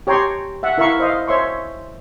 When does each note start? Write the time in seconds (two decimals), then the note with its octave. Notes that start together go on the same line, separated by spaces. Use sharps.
0.07 G4 C#5 G5 A#5 C6 C#6
0.63 E5 F#5
0.78 E4 A#4 E5 F5 B5 C#6
1.00 C5 D#5 F5
1.28 C5 C#5 E5 C6 C#6